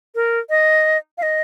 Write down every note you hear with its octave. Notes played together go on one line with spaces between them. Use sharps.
A#4
D#5
F5
D#5